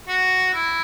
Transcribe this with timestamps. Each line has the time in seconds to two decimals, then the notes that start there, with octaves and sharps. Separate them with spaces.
0.08 F#4
0.54 E4